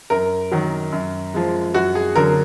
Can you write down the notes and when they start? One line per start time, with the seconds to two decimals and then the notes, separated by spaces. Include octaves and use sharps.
0.10 F#2 A#4
0.51 D#3 F#3
0.92 F#2
1.34 F3 G#3
1.74 F#2 F#4
1.95 G#4
2.15 D3 F#3 A#4